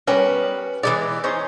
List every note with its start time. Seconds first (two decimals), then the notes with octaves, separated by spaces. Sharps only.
0.07 G3 B3 C#4 A#4 B4
0.83 E3 F3 G#3 B3 D5
1.24 C#4 D#4 C5